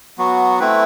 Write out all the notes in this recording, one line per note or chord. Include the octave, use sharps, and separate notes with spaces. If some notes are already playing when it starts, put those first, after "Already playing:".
F#3 B3 F#4
A3 C4 E4 B4